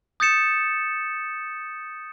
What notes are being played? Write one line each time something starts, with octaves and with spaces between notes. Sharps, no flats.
D#6 G6 A6 C#7 E7